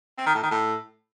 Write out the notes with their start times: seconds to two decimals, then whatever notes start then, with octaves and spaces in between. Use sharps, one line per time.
0.18 C4
0.26 D#3
0.34 A2
0.43 D#3
0.51 A2